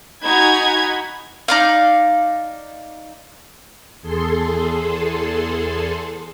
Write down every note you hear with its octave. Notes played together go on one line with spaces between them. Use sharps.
D#4 F#4 G#5 A#5 B5 G#6
D#4 D5 F5
E2 G#4 A4 C6